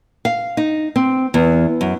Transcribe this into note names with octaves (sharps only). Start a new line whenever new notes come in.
F5
D#4
C4
E2
F#2